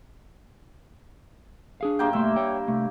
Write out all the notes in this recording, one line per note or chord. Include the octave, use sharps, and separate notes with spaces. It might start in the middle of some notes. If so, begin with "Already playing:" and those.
D4 G#4 F5
G2 A#3 G5
B1 A3 E5 C6
C#5 G5
C3 A3